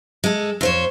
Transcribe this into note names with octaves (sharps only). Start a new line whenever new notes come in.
G#3 A4
F2 C5 C#5